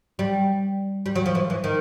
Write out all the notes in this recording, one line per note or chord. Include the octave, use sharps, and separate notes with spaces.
G3
G3
F#3
F3
E3
E3
D#3